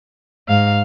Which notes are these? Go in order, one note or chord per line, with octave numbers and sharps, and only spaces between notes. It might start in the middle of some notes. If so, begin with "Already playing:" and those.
G#2 F5